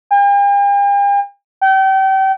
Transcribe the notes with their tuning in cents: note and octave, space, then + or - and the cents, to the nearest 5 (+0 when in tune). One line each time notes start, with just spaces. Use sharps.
G5 +45
G5 -35